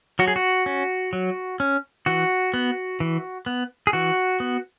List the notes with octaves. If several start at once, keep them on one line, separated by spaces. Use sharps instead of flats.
F#3 F#4
G#4
F#4
C#4
F#3
C#4
E3 F#4
B3
E3
B3
G#4
E3 F#4
B3